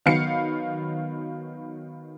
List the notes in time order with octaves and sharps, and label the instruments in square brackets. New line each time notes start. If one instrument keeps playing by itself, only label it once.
[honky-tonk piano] D#3 F#3 B3 F5 C7 C#7